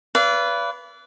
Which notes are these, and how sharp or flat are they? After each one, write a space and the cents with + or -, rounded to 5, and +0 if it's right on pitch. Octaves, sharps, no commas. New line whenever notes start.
B4 +0 D5 -30 F5 -35